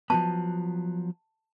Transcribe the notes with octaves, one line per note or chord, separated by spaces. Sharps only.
F3 F#3 B3 A5